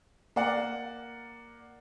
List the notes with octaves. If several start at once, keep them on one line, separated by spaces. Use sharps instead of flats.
A#3 D5 F#5